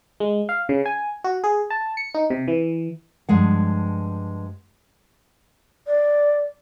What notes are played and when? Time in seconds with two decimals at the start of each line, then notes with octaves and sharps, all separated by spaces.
0.20 G#3
0.49 F5
0.69 C#3
0.86 G#5
1.24 F#4
1.44 G#4
1.70 A5
1.97 C#7
2.14 D#4
2.30 C3
2.48 E3
3.29 G2 F3 G#3 F#5
5.86 D5